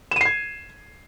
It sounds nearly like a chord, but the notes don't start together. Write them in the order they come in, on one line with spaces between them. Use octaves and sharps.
E7 D#7 C7 G#6